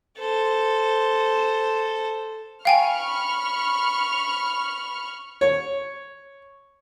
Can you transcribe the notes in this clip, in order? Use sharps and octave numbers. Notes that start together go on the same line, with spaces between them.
A4 C5
F5 G5 G#5 B5 C#6 F6
C#5